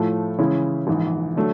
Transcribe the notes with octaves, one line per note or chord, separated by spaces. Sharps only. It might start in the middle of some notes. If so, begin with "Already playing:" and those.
Already playing: A2 F3 A3
C#3 E3 G#3 C#4 E4
A#1 G#2 E3
D3 F#3 A3